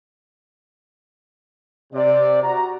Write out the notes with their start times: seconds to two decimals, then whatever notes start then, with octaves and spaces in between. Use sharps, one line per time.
1.93 C3 D5
2.43 F#4 A#5